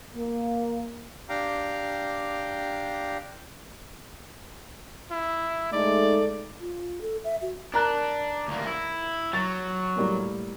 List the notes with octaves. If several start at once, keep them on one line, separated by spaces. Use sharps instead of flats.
A#3
D4 G4 F5 G5 A#5
E4
G#3 A3 D#4 D5
F4
A4
E5
F#4
D4 A#4 A#5 F#6
D2 A#3
E4
F#3 A6
A2 G3 A#3